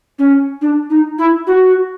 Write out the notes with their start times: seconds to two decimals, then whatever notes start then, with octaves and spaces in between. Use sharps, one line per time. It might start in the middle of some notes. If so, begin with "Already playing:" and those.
0.18 C#4
0.61 D4
0.90 D#4
1.18 E4
1.47 F#4